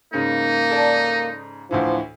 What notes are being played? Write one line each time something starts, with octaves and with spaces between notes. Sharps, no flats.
G#2 C#3 A#3 D#4
A4 D5
D2 A2 E3 F3